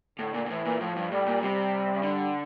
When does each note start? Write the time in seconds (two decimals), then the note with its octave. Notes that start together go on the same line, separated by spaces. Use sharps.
0.19 A2 D3
0.34 A#2
0.46 A#2
0.50 A2 E3
0.65 A#2
0.80 A2 F3
0.96 G2
1.11 A2 G3
1.26 A#2
1.41 C3 G3
2.03 D3